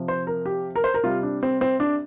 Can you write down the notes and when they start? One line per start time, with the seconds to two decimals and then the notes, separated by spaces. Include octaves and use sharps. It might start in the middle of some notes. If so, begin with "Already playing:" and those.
Already playing: C3 F3
0.08 C5
0.27 A#4
0.46 G4
0.76 A#4
0.84 C5
0.94 A#4
1.04 C3 G3 F4
1.23 D4
1.43 C4
1.61 C4
1.80 D4